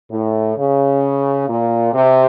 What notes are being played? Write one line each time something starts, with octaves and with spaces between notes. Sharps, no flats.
A2
C#3
A#2
C3